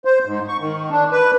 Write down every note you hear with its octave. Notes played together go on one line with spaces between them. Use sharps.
C5
G#2
C#6
D#3
D4
B4